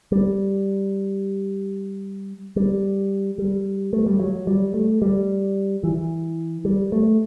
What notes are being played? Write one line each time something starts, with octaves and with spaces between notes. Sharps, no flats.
G3
G3
G3
A3
G3
F#3
G3
A3
G3
E3
G3
A3